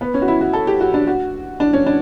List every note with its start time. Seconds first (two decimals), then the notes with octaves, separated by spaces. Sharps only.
0.01 B3
0.14 C#4
0.22 F#4
0.28 E4
0.41 F#4
0.53 A4
0.67 G4
0.81 F#4
0.94 D4
1.07 F#4
1.60 D4
1.73 C#4
1.86 D4